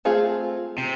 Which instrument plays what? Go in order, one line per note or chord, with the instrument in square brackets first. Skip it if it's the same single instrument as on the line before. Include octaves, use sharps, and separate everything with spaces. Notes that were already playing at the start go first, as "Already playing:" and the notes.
[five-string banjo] A3 C4 F4 G#4
[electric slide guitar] C3